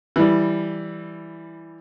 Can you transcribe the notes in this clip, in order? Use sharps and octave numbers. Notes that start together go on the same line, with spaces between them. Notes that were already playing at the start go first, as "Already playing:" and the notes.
E3 G3